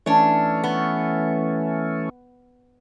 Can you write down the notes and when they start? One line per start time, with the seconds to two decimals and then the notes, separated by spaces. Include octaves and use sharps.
0.06 E3 A3 C#4 D4 C#5
0.64 B3